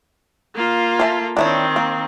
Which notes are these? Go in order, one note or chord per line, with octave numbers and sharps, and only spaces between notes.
A#3 F4
A4 E5 G#5
D#3 C4 D4 E4 C#5
A#3